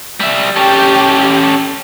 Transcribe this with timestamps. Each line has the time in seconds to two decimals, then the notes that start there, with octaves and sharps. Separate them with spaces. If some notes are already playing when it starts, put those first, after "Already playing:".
0.20 G3 E5
0.56 C#4 G4 A4